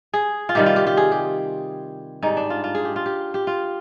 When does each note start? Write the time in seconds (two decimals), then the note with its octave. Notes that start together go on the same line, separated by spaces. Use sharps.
0.14 G#4
0.49 F4
0.55 C3 D#3 G3 G4
0.66 F4
0.76 G4
0.87 G4
0.97 G#4
1.12 G4
2.23 G#2 G3 D#4
2.37 D4
2.50 F4
2.64 F4
2.75 G#4
2.85 G4
2.96 F4
3.06 G4
3.34 G4
3.47 F4